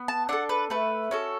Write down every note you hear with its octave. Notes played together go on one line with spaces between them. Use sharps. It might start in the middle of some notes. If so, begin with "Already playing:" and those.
Already playing: B3
A5
D4 A4 F#5
B4
A3 B4
C#4 F#4 A4